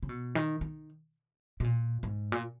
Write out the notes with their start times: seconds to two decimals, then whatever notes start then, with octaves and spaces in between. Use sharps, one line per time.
0.03 C#3
0.09 B2
0.35 D#3
0.61 D#3
1.60 B2
1.64 A#2
2.03 G#2
2.32 A#2